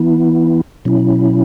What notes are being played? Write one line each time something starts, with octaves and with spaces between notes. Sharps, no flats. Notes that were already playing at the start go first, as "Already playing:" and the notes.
Already playing: E3 B3 E4
B2 F#3 C#4 E4